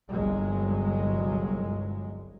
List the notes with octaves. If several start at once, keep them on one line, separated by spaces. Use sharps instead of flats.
G1 C2 G2 F#3 G#3